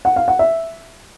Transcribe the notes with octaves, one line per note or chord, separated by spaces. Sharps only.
F#5
F5
F#5
E5